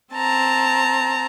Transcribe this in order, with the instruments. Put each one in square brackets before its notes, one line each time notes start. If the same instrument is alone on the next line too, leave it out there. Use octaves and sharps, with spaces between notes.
[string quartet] C4 A5 A#5